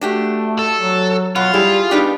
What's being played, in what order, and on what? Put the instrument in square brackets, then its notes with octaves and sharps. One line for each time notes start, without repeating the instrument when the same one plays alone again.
[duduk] A3 [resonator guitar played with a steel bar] D4 F#4 G4
[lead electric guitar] A4
[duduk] F#3
[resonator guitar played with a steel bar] B2 [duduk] F#3 [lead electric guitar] F4 [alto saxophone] F#5
[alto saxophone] G3 [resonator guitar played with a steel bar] E4 [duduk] G#4
[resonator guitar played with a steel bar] B3 D#4 G4 [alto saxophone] D4